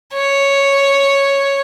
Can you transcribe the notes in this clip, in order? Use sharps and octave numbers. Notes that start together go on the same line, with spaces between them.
C#5